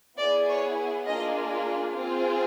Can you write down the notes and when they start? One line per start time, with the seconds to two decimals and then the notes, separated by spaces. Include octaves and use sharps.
0.19 B3 E4 G#4 D5
0.49 C#5
1.07 A#3 D4 F4 G#4 D#5
1.95 C4 F4 G#4